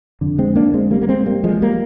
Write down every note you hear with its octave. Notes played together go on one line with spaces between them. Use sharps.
F2 D3
G#3 C4
A#3 D4
G#3 C4
G3 A#3
A#3
G#3 C4
G3 A#3
F3 G#3
G3 A#3